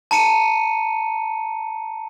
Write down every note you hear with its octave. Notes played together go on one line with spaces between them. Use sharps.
A5 A#5 C#7 D#7